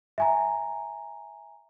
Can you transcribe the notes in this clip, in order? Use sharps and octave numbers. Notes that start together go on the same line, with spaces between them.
E5 G#5 A#5